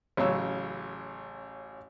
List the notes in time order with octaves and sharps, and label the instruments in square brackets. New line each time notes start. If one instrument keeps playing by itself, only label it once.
[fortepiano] A1 C#3 F#3 C#5 E6